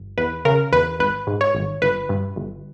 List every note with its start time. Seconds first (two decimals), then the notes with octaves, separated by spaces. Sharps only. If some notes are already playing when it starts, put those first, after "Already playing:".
Already playing: G1
0.18 E2 B4
0.45 C#3 A#4
0.73 E2 B4
0.99 G#1 B4
1.27 G#2
1.41 C#5
1.55 G#1
1.82 G1 B4
2.09 G2
2.36 G1